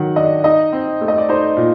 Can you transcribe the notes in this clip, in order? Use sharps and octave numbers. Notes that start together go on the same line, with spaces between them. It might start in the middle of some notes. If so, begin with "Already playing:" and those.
Already playing: D#3 F#3 F#5
D4 D#5
D#4 D#5
C4
A3
D#5
D5
D#4 C5
A#2